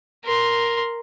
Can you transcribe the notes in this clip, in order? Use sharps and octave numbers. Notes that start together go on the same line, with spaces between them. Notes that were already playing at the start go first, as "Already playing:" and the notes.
A#4 C6